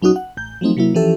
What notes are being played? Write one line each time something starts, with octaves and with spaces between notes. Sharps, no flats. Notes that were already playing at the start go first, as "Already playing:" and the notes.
A#1 F#3 C#4 D#4 F#4 D#6
F#5
A1 G6
F3 F#3 A3 C4 D#4
C3 F#3 A#3 E4
E3 F3 C#4 G4 A4 E5